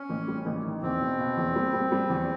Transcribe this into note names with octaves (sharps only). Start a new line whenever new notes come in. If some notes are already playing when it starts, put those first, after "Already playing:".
Already playing: C#4
A1
G3
A1
D#3
E2 C4
B2
B2
E2
G3
G3
G3
E2